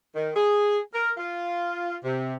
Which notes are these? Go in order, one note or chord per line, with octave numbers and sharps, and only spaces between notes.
D#3
G#4
A#4
F4
C3